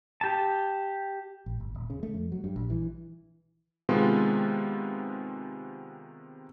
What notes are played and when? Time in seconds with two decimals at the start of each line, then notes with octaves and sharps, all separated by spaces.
0.21 G4 A5
1.46 A1
1.60 G1
1.75 D#1
1.90 C#3
2.03 A3
2.14 F2
2.32 F#3
2.44 G2
2.56 A#1
2.70 E3
3.89 C3 D#3 G#3 B3 F4